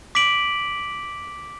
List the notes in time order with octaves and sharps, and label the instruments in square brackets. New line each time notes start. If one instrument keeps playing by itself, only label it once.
[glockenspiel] D6 B6 D7 F#7